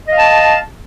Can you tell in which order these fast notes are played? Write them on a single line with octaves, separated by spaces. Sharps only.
D#5 F5 A5